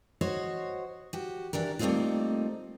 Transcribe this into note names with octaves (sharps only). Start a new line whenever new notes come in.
F#4 C5 C#5 D#5
F#4 G4
E3 D4 G4 A#4
G3 A3 A#3 C4 D#4 F4